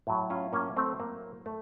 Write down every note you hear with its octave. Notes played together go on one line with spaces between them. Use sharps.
A2 F#3
C#4 F4
A#3 C#4
A3 C4
A#3
A3